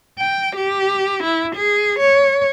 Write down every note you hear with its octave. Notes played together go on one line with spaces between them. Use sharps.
G5
G4
E4
G#4
C#5